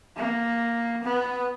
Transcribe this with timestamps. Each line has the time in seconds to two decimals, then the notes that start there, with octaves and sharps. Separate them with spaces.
0.16 A#3
1.03 B3